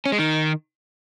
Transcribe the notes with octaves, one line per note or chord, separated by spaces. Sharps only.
C#4
G#3
D#3